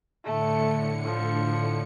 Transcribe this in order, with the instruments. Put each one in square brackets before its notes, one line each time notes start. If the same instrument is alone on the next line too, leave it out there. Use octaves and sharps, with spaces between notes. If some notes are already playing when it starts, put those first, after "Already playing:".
[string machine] A2 D3 C#7 [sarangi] A3
[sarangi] F3